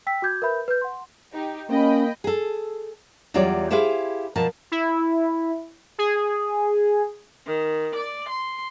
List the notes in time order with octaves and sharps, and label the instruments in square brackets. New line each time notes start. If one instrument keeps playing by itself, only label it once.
[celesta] G5 E6 B6
F#4 D6 G6 G#6
A#4 B4 E5 B5 G6
B4 G6
F#5 C6
[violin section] D#4 G4
[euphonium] A#3 [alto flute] C#4 [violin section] D#5 G5 B5
[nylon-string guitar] G#4 A4
E2 F#3 G3 F4 C#5 D5
E4 G4 G#4 C5 E5 F5
B2 F3 A#4 A5
[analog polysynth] E4
G#4
[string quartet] D#3
D5
C6